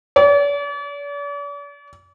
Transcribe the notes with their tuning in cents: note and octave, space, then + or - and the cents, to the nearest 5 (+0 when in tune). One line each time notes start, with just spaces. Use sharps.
D5 -45